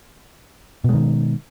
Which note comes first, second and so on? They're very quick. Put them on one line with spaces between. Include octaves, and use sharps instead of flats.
B2 G#3 D#3